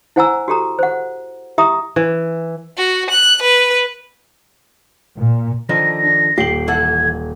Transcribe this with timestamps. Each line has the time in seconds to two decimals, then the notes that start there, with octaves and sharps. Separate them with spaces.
0.16 E4 C5 F#5 G#5 A#5 E6
0.48 F#4 G4 A4 A#5
0.79 C5 F#5
1.58 E4 G4 E5 A#5 D#6
1.96 E3
2.77 F#4
3.10 F#6
3.42 B4
5.17 A#2
5.69 D3 D#3 F3 A#6
6.03 D4
6.38 D#1 G4 C7 F#7
6.68 E3 A4 F#5 G#6